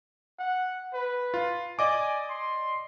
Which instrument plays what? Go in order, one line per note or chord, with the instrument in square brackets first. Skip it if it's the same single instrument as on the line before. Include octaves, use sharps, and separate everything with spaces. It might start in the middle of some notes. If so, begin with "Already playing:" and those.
[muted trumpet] F#5
B4
[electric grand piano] F4
[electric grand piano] D5 D#5 D6 [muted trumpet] G#5
[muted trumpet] C6